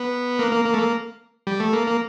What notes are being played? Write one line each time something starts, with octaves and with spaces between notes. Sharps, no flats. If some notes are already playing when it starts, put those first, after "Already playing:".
Already playing: B3
A#3
A#3
A#3
A3
A#3
G3
A3
A#3
A#3